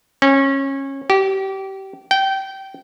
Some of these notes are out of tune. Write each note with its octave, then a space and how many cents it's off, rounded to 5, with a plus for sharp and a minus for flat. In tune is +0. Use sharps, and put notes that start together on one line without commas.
C#4 -25
G4 -25
G5 -20